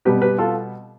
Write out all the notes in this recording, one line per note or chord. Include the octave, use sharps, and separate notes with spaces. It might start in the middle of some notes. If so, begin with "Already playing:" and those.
B2 G3 B3 G4 B4
G4 B4
F4 A4